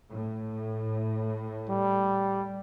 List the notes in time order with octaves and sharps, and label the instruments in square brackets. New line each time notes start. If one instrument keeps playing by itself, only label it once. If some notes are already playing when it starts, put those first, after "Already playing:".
[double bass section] A2
[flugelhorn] G3